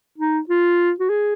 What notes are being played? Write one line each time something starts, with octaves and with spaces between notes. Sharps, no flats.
D#4
F4
F#4
G#4